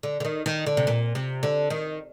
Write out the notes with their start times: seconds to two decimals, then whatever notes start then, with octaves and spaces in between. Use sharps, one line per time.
0.03 D3
0.20 D3
0.25 D#3
0.46 D#3
0.66 D3
0.77 C3
0.87 A#2
1.15 C3
1.43 D3
1.70 D#3